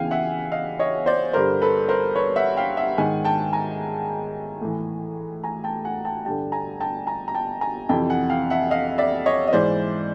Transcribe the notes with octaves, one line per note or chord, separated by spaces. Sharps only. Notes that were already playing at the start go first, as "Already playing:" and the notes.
Already playing: E2 C#3 E3 F5 G5 G#5
E5 F#5
D#5 F5
C#5 D#5
C5 D5
G2 D3 A#4 C5
A4 B4
A#4 C5
B4 C#5
E5 F#5
F5 G5
E5 F#5
G#2 D#3 F#5 G#5
G5 A5
G#5 A#5
A2 E3
G#5 A#5
G5 A5
F#5 G#5
G5 A5
G2 D3 G5 A5
G#5 A#5
G5 A5
G#5 A#5
A#5
G5 A5
G#5 A#5
F2 C3 E3 G5 A5
F#5 G#5
F5 G5
E5 F#5
D#5 F5
D5 E5
C#5 D#5
D#5
G#2 E3 C5 D5